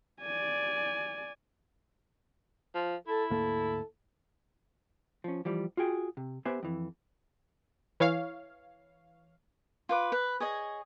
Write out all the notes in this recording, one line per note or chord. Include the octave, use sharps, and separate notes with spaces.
D5 G#5
F3
E4 A4
D2 G#2 A#3 A4
F3 C#4
E3 F3 G3
F4 F#4 G#4 G5
C3
B3 G4 B4 C5 E5 G#5
F2 E3
E3 C#5 F5
F4 B4 D6
B4
G#4 C#5 D#5